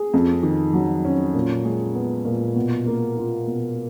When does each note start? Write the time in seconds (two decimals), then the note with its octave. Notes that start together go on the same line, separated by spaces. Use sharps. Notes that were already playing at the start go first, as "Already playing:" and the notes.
Already playing: G#4
0.14 F2
0.43 D#3
0.73 F#3
1.05 C#4
1.34 A#2
1.65 G#3
1.95 B3
2.25 A#2
2.56 B2
2.86 A#3
3.17 F4
3.47 B2